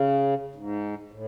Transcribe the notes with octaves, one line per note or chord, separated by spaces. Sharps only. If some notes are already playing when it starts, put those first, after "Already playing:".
Already playing: C#3
G#2
A2